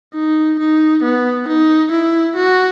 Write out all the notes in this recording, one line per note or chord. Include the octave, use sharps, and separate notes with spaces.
D#4
D#4
B3
D#4
E4
F#4